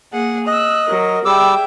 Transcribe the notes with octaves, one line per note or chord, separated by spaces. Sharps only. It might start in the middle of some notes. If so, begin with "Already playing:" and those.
A#3 G#4 F#5
D#5 E6 F#6
F#3 A#4
G3 G#4 E5 G5 D6 E6